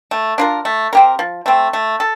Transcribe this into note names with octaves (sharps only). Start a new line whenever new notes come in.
A3
D4 F4 A#4
A3
C4 G4 A#4
F3
A3 C4
A3
A4